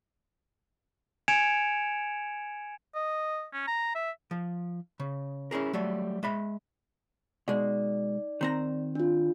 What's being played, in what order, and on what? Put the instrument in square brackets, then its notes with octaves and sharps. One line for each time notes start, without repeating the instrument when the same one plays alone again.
[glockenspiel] G#5 G#6 C#7 D7 E7 F7
[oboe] D#5
C#4
A#5
E5
[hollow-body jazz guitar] F3
C#3
C#4 E4 G#4 A#4
F#3 G3 A3
G#3 E5 B5
[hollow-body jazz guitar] B2 G#3 [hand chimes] D#4 D5
[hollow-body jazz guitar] D#3 C4 A#5
[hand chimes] D4 F4